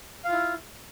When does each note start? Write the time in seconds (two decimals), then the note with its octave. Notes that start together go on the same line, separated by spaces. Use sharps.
0.25 F5
0.28 F4
0.32 E4